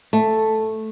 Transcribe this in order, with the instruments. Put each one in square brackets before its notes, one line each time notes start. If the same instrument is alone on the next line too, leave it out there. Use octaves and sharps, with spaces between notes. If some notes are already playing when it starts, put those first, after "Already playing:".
[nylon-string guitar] A3